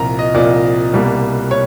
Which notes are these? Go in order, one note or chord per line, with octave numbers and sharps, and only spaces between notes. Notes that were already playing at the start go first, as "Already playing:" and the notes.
Already playing: C2 A#2 F3 A#5
D#5
C2 A#2 F3 D5
C2 B2 G3 A#3
C#5